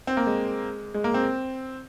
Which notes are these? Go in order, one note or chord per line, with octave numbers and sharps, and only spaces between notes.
C4
A#3
G#3
G#3
A#3
C4